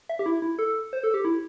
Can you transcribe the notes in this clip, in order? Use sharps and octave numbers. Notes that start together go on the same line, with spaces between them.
E5
G4
E4
E4
A4
C5
A4
G4
E4